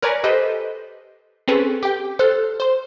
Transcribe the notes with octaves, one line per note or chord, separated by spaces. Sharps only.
A#4 B4 C#5 D5 G#5 A#5
G4 A4 B4 C5 D#5
C4 C#4 G#4 A4 B4
G4 G5
A4 C5 F6 F#6
C5 C6